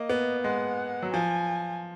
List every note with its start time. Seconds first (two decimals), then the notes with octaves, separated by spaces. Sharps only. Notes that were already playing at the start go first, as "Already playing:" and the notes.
Already playing: A#3 D#5
0.10 B3
0.44 G#3 F#5
1.02 F#3
1.13 F3 G#5